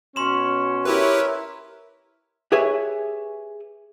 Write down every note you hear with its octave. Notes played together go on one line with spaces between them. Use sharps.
B2 C#4 C6 E7
E4 G4 A#4 B4 C#5 E5
G4 G#4 B4 C#5 E5 G#5